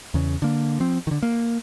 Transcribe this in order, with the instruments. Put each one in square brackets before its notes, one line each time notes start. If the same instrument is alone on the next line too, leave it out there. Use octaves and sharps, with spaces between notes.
[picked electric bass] E2 C#3
D3 A#3
F3 C4
D3 D#3
A#3